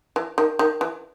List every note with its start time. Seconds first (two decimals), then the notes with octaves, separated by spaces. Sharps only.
0.16 E3
0.38 D#3
0.59 D#3
0.81 E3